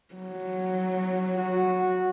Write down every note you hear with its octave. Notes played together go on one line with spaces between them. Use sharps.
F#3
F#4